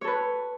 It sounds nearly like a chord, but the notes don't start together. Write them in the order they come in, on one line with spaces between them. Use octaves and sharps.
C#5 A4 B4